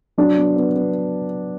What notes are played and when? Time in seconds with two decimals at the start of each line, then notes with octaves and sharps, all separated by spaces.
0.18 F#3 D4
0.37 B3
0.56 B3
0.75 B3